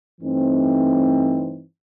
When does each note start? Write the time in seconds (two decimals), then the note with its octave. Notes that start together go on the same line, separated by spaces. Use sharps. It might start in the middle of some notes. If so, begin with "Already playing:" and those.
0.20 G2 E3 A3 C4 D#4